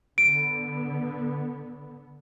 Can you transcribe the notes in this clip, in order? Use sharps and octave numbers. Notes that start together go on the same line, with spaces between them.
D3 B3 D7